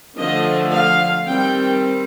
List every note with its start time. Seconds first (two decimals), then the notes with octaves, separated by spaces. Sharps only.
0.18 D3 F3 A3 D#5
0.73 F5
1.27 D#3 G3 C4 G5